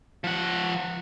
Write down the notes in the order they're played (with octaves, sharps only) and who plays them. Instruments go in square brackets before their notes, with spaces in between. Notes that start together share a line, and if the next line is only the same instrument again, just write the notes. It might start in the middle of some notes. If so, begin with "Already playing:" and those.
[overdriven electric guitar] F3 F#5